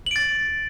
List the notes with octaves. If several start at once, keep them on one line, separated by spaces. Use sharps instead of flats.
A6 D7 F#7